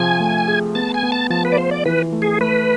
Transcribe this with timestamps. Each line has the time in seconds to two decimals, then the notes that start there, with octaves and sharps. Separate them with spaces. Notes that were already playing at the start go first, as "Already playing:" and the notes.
Already playing: C3 F3 G#4 G#5
0.20 A3
0.48 G#4
0.75 B3 A5
0.94 G#5
1.03 B3
1.12 A5
1.30 F3 A5
1.45 B4
1.52 D5
1.57 F4 C5
1.71 D5
1.85 E3 B4
2.13 A3
2.22 G#4
2.41 A3 B4